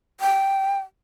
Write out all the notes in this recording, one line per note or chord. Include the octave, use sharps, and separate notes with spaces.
G5